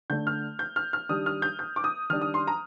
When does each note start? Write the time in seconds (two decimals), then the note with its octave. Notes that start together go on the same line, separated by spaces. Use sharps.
0.10 D3 A3 D4 G6
0.27 F6
0.59 G6
0.76 F6
0.93 F6
1.09 D#3 G3 D4 D#6
1.26 F6
1.42 G6
1.59 G6
1.76 D6
1.84 D#6
2.10 D#3 G3 D4 F6
2.22 D#6
2.34 C6
2.47 A#5